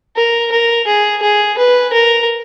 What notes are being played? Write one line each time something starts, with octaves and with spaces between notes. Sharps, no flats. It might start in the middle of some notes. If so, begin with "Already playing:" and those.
A#4
A#4
G#4
G#4
B4
A#4